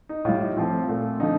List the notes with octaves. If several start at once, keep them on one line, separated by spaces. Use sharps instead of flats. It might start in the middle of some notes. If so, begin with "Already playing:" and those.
D#4
A2 G3 F4
D#4
A2 F3 A3 C4
A#2 A3
D3 F3 A3 D#4